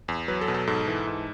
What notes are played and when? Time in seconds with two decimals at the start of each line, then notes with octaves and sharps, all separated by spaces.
0.08 E2
0.28 F#3 B4
0.41 A4
0.48 B2
0.54 A4
0.67 G#2 A4
0.87 E3
1.07 G#2